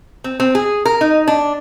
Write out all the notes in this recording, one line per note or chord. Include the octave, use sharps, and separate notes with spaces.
C4
C4
G#4
A#4
D#4
D4